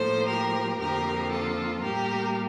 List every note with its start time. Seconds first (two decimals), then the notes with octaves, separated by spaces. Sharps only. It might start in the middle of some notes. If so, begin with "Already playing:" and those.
Already playing: A2 F3 A#3 A4 C5
0.27 G4 A#4
0.79 F2 D3 F3 A#3 G4 A#4
1.31 F4 A4
1.82 A2 G3 A#3 G4 A#4